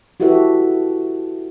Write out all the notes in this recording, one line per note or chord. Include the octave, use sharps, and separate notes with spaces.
E4 F#4 G4 A4 B4 E5